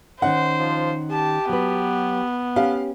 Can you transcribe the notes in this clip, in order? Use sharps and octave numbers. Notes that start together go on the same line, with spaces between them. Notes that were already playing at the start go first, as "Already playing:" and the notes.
D#3 C#4 D#4 C5 F#5
F3
G4 A5
F#3 B3 B4
C#4 G4 F5